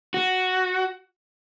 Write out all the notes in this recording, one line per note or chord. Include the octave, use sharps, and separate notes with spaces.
F#4